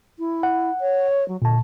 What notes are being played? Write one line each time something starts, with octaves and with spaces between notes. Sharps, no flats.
E4
F#5
C#5
F#3
A#2 D3 A5